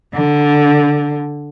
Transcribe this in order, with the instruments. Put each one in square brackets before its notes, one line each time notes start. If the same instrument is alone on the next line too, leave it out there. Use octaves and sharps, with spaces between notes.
[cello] D3